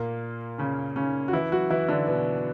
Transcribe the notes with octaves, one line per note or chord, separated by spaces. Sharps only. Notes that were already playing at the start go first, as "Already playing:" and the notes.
Already playing: A#2 A#3
C#3 C#4
C#3 C#4
F#4
E3 E4
F#3 F#4
E3 E4
D3 D4
B2 B3